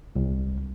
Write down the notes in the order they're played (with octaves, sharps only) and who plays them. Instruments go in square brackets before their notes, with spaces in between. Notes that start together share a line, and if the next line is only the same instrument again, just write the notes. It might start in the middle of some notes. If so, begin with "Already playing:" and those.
[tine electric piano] C2